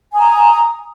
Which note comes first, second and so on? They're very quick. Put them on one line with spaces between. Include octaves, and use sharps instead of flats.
G#5 D#6 A#5